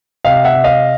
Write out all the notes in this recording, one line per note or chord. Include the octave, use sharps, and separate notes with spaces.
C3 D#5 F5
E5 F#5
C3
D#5 F5